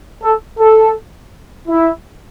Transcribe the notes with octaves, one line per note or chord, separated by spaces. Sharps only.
A4
A4
E4